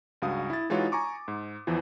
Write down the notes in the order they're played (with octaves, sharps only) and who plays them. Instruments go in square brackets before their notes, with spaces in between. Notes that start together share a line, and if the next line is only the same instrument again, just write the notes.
[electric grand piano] C#2 G2 F#4 F5 D#6
E4 A6
E3 G#3 D#4 F4 F#4 C#5
G#5 A#5 C#6 D6
G#2
E2 E3 F3